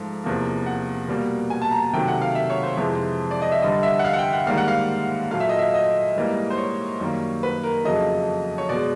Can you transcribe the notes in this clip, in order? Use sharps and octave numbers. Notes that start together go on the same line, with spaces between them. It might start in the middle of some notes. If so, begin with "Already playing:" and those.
Already playing: G#2 F3 A3
E2 C3 F3 A#3
F#5
B2 G3 A#3
G#5
A5
A#5
A5
C3 D#3 F#3 A3 G5
F#5
F5
E5
C#5
C5
F2 C3 E3 G#3
D5
D#5
E5
G2 D3 G3 D#5
E5
F#5
F5
F#5
G5
F#5
G#2 D#3 G3 A#3 F5
F#5
F5
A#2 F#3 A3 F5
E5
D#5
E5
D#5
G#2 E3 G3 A#3
C5
C#5
F#2 D#3 G3 A#3
B4
A#4
F2 C#3 F#3 A3 D#5
C#5
B2 G#3 D5